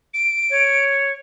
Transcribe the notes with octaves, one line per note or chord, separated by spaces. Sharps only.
D7
C#5